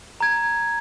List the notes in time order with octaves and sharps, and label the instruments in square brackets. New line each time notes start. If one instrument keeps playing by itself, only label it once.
[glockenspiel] A#5 G#6